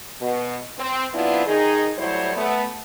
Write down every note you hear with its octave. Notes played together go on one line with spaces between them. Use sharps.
B2
C4
F#3 B3 C4 D4 E4 F4
D#3 D#4 G#4
A2 F#3 G3 E4 C5 C#5
A3 B3